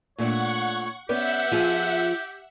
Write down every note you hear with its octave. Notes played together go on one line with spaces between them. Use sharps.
A#2 A3 D4 C#5 F#5 C#6
B3 C#4 G4 D5 E5 F#5
F3 F4 G#4